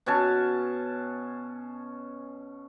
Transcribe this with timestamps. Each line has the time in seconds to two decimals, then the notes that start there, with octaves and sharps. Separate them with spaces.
0.06 B2 C#4 G#5 A5